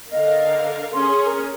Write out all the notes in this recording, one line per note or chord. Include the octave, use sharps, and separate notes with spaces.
D3 A#4 D#5 F5
C#4 G#4 C6
A#4